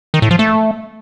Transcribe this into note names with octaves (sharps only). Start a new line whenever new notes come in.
D#3
A2
F3
A3